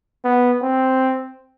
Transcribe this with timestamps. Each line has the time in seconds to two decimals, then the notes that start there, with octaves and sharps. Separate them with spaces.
0.25 B3
0.62 C4